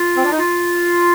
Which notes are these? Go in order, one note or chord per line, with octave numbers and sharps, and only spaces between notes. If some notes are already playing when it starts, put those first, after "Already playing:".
Already playing: F4
C4
D4
D#4
F4